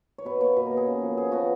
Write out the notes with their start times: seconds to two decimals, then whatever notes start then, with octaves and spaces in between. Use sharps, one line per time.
0.18 C#5
0.25 B2 B4
0.41 A#3 C#5
0.56 B2 B4
0.67 A#3 A#4
0.77 G#4
0.87 C#3
1.02 F3 B3
1.17 C#3 G#4
1.32 F3 B3 F#4